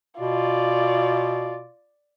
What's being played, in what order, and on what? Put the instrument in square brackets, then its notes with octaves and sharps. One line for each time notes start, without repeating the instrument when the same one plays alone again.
[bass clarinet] B2 [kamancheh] F4 D5